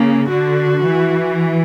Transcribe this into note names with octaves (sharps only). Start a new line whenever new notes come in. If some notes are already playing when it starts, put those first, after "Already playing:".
Already playing: C#3 A#3
D3 F#4
E3